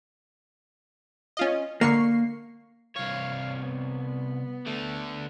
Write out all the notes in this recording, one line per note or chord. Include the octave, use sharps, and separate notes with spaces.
C#4 F4 D#5
D3 A#3 C#6 C7
C2 C#5 F5
B3
D3 A3